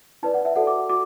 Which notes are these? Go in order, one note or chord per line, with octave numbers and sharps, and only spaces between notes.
E4 B4 D5 A5
F#5
E5
F#4 A4 D5 F#5
D6
F#4 D6